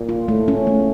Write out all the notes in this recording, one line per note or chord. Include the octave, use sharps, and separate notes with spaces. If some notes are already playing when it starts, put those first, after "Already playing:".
Already playing: A#2
F4
A2 A3
C#4
E2
A3